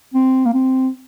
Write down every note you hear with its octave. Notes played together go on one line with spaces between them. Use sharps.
C4
A#3
C4